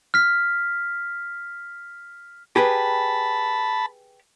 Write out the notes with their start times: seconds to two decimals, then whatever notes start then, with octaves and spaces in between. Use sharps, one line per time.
0.14 F6 B6
2.56 G4 G#4 B4 A5 B5